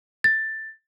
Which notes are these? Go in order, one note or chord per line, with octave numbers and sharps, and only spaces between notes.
A6